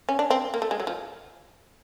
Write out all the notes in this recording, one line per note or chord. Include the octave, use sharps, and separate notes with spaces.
C#4
D4
C4
A#3
A3
G#3
F#3
F3